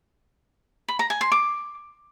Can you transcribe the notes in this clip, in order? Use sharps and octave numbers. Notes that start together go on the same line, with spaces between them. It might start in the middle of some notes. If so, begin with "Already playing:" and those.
B5
A#5
G#5
C6
D6